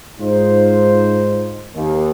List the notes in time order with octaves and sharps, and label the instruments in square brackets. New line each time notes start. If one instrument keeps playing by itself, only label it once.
[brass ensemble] G#2 D#4 F4 C5
D#2